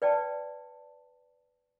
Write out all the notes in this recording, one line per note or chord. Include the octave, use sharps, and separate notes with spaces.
B4 D5 G5 A5